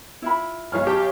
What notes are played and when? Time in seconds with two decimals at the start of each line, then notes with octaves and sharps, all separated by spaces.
0.22 E4 F4 B5
0.72 B1 C#5 F6
0.87 G4 A5